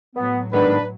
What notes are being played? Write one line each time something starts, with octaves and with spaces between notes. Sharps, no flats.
A2 F#3 B3
G#2 D#3 B3 D4 B4